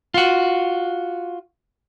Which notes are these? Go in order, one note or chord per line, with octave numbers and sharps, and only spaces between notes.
F4 F#4